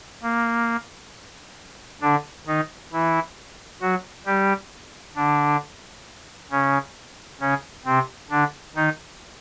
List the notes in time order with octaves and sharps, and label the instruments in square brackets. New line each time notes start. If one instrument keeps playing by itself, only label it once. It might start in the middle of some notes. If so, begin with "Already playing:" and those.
[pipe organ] A#3
D3 D4
D#3 D#4
E3 E4
F#3 F#4
G3 G4
D3 D4
C#3 C#4
C#3 C#4
C3 C4
D3 D4
D#3 D#4